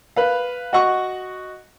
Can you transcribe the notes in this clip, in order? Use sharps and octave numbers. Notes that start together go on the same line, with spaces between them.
B4 F5
F#4 D#5 F#5 C#6